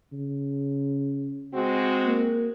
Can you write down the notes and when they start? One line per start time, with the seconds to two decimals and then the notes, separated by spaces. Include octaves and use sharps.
0.13 C#3
1.54 G#3 C4 F#4
2.05 A#3